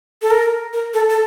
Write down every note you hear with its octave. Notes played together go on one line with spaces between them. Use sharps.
A4
A#4
A#4
A4
A4